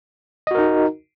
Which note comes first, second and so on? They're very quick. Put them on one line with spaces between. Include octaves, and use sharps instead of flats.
D#5 F#4 A#4 D#4